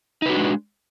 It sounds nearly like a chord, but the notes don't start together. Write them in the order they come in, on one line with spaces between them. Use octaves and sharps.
D#4 B4 F#4 D4 G#3